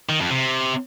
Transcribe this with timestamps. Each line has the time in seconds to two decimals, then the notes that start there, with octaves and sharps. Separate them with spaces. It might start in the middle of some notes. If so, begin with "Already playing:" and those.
0.09 D#3
0.20 F2
0.30 C3